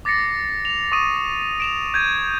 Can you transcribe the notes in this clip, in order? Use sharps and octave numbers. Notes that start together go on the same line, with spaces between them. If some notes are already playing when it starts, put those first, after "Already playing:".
D6 A6 A#6 C7 C#7
F7
C#6 D#6 D#7
D7 E7 F7
G6 G#6 D#7